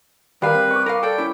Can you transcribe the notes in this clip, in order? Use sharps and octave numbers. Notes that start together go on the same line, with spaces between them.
D#3 G3 A#4 B4 F5
C4
C#6 D6
A#4 B4 F5
A4 D5 G5
C#4 E4